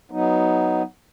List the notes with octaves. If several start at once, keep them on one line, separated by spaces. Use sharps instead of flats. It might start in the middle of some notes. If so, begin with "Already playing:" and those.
F#3 B3 D#4